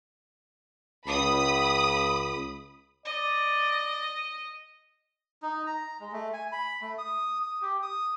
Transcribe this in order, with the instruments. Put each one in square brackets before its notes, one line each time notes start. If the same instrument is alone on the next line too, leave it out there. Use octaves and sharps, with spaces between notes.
[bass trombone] C#2 [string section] B5 D#6
[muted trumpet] D5 [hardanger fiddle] D#5
[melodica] D#4
A#5
G#3
A3
G#5
B5
A3
D#6
D#6
G4
D#6